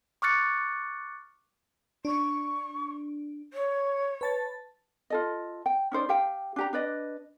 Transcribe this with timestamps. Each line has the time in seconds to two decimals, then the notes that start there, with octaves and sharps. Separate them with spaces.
0.22 C#6 D6 F6 F#6 A6 C#7
2.05 D4 C#6
3.53 C#5
4.21 B4 A5 A6
5.10 F4 A4 D#5
5.66 G5
5.92 C#4 D#4 C5 D5
6.09 G4 F5 G5
6.56 D4 G4 A#5
6.73 D4 B4 D5 D#5